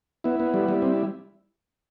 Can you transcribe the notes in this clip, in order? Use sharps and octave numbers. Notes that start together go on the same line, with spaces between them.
B3 E4
B3
G3
G3
C4